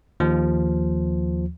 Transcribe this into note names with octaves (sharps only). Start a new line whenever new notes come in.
D#2 F3